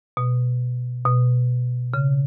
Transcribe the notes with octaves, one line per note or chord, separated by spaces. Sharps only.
B2
B2
C#3